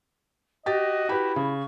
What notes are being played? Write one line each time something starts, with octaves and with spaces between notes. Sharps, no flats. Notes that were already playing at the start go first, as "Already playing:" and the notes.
F#4 G4 D#5 A6
E4 G4 B4
C#3 C#6